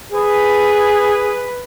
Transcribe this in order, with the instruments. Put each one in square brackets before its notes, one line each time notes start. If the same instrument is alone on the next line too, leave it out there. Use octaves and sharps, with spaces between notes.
[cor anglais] G#4 [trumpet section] B4